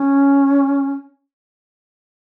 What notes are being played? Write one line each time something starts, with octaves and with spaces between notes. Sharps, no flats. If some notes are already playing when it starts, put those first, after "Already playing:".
Already playing: C#4